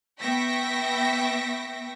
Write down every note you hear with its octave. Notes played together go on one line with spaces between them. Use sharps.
B3 E5 G5 C#6 A#6 B6